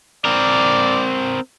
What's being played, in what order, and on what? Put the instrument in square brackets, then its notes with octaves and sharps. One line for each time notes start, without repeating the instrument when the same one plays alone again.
[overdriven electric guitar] C4 A#4 [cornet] D5